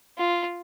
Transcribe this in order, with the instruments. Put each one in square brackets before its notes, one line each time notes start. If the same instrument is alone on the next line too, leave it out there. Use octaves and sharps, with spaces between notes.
[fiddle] F4